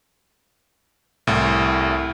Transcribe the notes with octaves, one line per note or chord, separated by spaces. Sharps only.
C2 A2